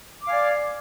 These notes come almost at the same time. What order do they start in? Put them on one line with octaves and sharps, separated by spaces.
D6 F5 G#5 D5